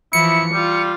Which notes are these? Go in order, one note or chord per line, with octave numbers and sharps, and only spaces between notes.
E3 F3 E4 C#7
G3 F4